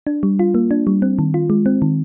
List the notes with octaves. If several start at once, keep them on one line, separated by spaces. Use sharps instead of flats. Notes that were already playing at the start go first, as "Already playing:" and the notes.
D4
G3
F4
A#3
D4
G3
C4
D#3
F4
G#3
C4
D#3